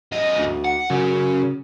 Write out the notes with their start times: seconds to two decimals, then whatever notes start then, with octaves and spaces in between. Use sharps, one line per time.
0.12 F#2 D#5
0.37 D2
0.64 F#5
0.90 F#2 C#3